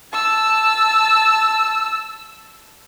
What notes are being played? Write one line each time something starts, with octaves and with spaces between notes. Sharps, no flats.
A5 E6